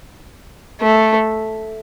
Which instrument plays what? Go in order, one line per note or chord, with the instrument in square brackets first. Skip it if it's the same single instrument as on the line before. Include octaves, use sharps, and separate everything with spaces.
[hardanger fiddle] A3